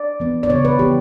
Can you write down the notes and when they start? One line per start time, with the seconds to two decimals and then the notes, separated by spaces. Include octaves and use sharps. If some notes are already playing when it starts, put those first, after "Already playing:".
Already playing: D5
0.20 E3 B3
0.43 D5
0.50 C#3 E3 B3 C#5
0.65 B4
0.79 E3 B3 G4